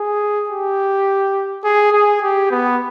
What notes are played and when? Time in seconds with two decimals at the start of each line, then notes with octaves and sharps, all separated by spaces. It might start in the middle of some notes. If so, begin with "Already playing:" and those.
Already playing: G#4
0.49 G4
1.64 G#4
1.92 G#4
2.22 G4
2.51 B3